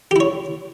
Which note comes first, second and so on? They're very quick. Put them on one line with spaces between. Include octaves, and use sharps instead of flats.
G4 E4 C#5